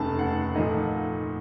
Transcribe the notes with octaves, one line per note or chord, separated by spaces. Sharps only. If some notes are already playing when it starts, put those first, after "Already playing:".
Already playing: F1 D#2 C#3 A3 A5
F#5
A#2 F3 A3 D#4